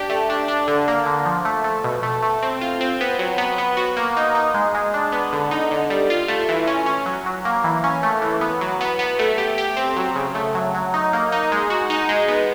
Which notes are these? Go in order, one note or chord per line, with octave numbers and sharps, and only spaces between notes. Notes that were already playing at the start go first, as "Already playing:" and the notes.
Already playing: D4 G4
A3
D4
D4
D3
A#3
D3
F3
A3
A3
B2
A3
A3
C4
F4
C4
B3
F#3
B3
B3
F#4
A#3
D#4
D#4
G#3
G#3
D4
B3
D3
D#4
D3
G3
F4
A3
E3
C#4
C#4
F#3
F#3
A#3
E3
C#4
A3
E3
B3
F#3
B3
B3
A3
G4
G4
C4
F#3
C#3
A3
F#3
F#3
D#4
A#3
D#4
G#3
F#4
D#4
G#3
B3